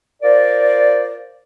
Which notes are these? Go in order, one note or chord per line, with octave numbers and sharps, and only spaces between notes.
F4 A#4 C5 D5